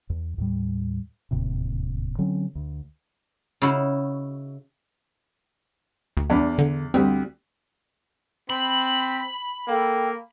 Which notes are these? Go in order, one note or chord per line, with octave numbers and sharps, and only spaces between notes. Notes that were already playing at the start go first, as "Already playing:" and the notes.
E2
D#2 A2 G3
E1 D#2 A2 C3
D3 F#3 C4 C#4
D2
C#3 D#4 E4 F#4
D2
E2 D4 B5
D3
D2 G3 C4
C4 B5
A#3 A4 G5